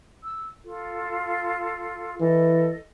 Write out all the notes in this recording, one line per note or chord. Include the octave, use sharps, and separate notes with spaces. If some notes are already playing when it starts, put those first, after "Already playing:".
E6
F4 A4
E3 A4 D#5